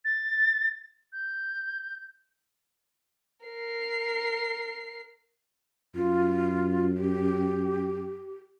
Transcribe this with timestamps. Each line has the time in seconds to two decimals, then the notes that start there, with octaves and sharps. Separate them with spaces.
0.05 A6
1.13 G6
3.46 A#4 C7
5.95 F#2 F4
6.98 G4